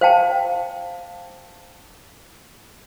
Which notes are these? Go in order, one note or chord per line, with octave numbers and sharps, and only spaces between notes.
C5 F5 G5 A5